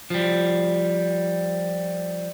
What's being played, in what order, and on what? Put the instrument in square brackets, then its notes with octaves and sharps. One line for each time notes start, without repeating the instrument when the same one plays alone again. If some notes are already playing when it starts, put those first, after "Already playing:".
[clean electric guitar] F3 G3